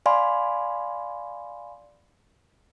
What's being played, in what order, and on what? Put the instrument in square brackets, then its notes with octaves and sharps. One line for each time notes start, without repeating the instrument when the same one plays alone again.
[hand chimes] D5 F5 G#5 B5 C6